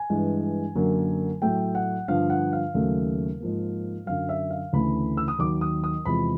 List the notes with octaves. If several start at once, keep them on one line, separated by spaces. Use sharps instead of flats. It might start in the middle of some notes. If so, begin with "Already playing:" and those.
Already playing: G#5
G2 E3 G#3
F#2 D3 F#3 A#3
A2 F#3 A3 G5
F#5
G2 D3 F3 F5
F#5
F5
D#2 C#3 F#3 A3
G#2 F3 A#3
F#2 D3 F#3 F5
E5
F5
D2 C#3 E3 A3 B5
E6
D#6
D#2 D#3 F#3 D6
D#6
D#6
E2 C3 F3 G#3 B5